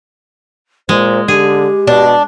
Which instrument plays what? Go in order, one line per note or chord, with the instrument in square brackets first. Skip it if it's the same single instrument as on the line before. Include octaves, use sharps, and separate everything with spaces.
[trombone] A#2 [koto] G#3 [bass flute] C5
[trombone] D3 [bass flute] G4 [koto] G#4
[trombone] B2 [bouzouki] D4